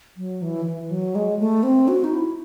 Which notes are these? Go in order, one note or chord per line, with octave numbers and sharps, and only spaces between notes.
F#3
E3
E3
F#3
G#3
A3
C4
F#4
D#4
E4